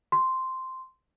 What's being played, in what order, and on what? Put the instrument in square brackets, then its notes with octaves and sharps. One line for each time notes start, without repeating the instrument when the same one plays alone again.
[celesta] C6